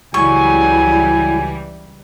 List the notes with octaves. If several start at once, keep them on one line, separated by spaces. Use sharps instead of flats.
C#2 E3 F#3 G3 E4 G#4 G#5 C#6